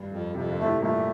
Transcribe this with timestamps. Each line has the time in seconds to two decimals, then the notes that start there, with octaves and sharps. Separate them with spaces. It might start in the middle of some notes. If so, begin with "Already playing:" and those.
Already playing: G2
0.12 F2
0.35 F2 C3
0.49 D3
0.59 A2 C3 A3
0.82 G2 A#2 A3